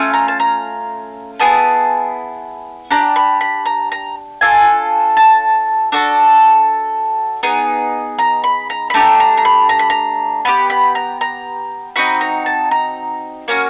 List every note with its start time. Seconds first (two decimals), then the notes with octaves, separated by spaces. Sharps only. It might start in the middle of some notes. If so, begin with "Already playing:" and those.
Already playing: A3 C#4 F4
0.14 A#5
0.28 A5
0.40 A#5
1.40 B3 E4 G#4 A5
2.91 D4 G4 A#5
3.16 B5
3.41 B5
3.66 A#5
3.92 A#5
4.41 D4 F4 A4 G#5
5.17 A5
5.92 D4 F#4 A4
7.43 B3 D#4 G#4
8.19 A#5
8.44 B5
8.70 A#5
8.90 B5
8.94 A3 D4 G4 A#5
9.20 A#5
9.37 A#5
9.45 B5
9.69 A#5
9.79 B5
9.90 A#5
10.45 B3 D4 G4 B5
10.70 B5
10.95 A#5
11.21 A#5
11.96 C4 D#4 F#4 B5
12.21 A#5
12.46 A5
12.71 A#5
13.48 A#3 C#4 F#4